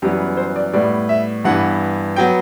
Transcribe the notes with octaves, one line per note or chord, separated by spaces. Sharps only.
F#2 E3 G3 B3 G4
B4
C5
D5
A2 G3 B3 D5
E5
G2 E3 B3 F#5
F#3 B3 G5